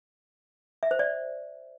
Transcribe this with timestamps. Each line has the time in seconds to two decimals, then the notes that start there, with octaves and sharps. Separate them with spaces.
0.83 E5
0.91 C5
0.99 D5